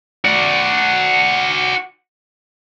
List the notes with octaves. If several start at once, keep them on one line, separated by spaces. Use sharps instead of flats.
F#4 D5